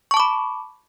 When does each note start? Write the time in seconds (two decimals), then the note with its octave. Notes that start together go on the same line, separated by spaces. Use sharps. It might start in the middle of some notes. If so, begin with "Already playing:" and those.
0.11 C#6
0.14 A5
0.17 D6
0.20 B5